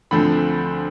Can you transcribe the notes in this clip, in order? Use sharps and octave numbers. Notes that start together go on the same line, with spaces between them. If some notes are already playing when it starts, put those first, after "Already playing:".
D2 D3 F3 A3 C4 B5